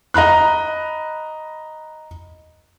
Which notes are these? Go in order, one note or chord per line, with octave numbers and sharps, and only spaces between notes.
D#5 A#5 B5 F#6